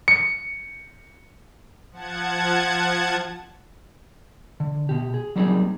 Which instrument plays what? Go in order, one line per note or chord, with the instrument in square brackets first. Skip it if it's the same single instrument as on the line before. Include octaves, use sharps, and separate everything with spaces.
[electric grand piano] C#7
[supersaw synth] F3 F#5 A5 G#6
[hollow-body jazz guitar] D3
B2 G4
G#4
F#3 G3 A#3 C4 D#4 G#4